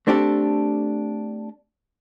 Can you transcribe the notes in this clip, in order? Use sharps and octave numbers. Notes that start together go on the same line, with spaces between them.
A3 C4 D4 G4 A4